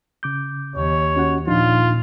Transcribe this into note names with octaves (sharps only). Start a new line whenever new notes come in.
C#3 D6 G6
D#2 C#5
C#4 F#4 F#5
A#2 F3 D4 D#4 F4